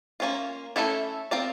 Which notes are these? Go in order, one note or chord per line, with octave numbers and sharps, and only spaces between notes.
A#3 C#4 F4
A3 C#4 E4 A4 C#5
C4 F4 A#4 D5